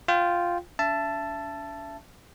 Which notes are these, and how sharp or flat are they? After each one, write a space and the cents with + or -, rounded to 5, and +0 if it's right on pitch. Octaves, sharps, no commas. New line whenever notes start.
F4 +0 G5 -10
D4 -45 E5 +30 A5 +0